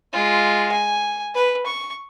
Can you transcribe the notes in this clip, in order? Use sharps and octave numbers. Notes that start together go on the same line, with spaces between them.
G#3 F4
G#5
B4
C#6